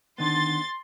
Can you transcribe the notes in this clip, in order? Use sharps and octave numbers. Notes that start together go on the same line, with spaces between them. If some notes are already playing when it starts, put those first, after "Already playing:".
D3 D#3 B3 C6 A6